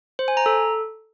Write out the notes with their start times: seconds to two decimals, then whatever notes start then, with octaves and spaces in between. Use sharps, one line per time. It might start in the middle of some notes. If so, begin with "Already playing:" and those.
0.19 C5
0.28 G#5
0.37 A#5
0.46 A4